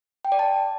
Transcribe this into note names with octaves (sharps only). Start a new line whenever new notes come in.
G5
D5
A5